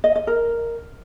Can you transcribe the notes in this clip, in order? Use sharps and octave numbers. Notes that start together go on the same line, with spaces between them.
D#5
D#5
A#4